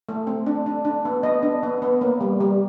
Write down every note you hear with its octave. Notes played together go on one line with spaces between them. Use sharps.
A3
C4
D4
D4
D4
B3
B3 D#5
D4
B3
B3
A#3
G3
G3